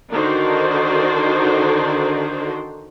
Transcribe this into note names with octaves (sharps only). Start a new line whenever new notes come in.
D3 D#3 D4 D#4 F#4 C5